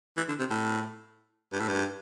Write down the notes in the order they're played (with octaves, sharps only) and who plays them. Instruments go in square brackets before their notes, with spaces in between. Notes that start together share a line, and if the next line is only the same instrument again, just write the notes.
[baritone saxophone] E3
D3
C3
A2
G2
A2
G2